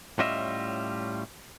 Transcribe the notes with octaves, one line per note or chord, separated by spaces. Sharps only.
A2 G3 C#4 F4 D#5 E5